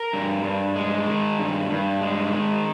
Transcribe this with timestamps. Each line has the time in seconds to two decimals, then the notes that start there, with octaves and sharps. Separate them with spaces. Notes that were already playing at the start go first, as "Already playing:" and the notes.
Already playing: A#4
0.13 G2
0.44 G2
0.76 G#3
1.07 D#3
1.38 G2
1.70 G2
2.01 G#3
2.33 D#3